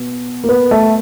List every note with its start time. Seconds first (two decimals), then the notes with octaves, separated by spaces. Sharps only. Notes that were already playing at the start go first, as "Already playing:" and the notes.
Already playing: B2
0.44 A#3
0.49 B3
0.71 A3